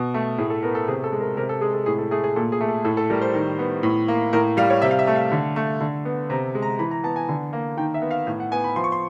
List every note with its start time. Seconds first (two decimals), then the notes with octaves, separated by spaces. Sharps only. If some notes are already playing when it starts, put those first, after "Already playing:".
Already playing: B2
0.14 A3
0.38 A2 G#4
0.50 A4
0.63 B3 A#4
0.75 A4
0.88 C3 G#4
1.04 A4
1.12 G#3
1.20 A#4
1.37 C3 A#4
1.49 A4
1.61 G#3 G#4
1.74 A4
1.86 A2 G#4
1.98 A4
2.11 A3 G#4
2.24 G#4
2.36 A#2 A4
2.52 G#4
2.61 A3
2.68 A4
2.84 A2 A4
2.97 A4
3.10 G3 A#4
3.21 C5
3.34 D#3
3.59 B3
3.83 A2
4.08 A#3
4.33 A2 A#4
4.57 G3 F5
4.70 C#5
4.82 C3 E5
4.91 F5
4.99 E5
5.07 A3
5.15 F5
5.32 D3
5.56 A3
5.81 D3
6.05 B3
6.30 C3 A#5
6.55 G#3
6.62 A#5
6.79 E3 B5
6.91 A#5
7.04 B3 A5
7.16 G#5
7.29 D3
7.53 A#3
7.77 D#3 G5
7.94 E5
8.02 B3
8.11 F5
8.27 A2
8.40 F#5
8.52 B3 G#5
8.64 B5
8.76 F3 C6
8.84 C#6
8.92 C6